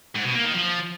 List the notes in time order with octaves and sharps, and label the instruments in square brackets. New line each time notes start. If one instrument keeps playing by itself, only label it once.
[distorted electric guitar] G#2
B2
A#3
D#3
F3